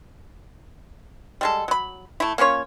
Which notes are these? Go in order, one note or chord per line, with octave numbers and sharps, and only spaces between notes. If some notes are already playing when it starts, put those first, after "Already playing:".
G3 G#3 A4
F#3 B5
A3 E4
A#3 C#4 F4 C#5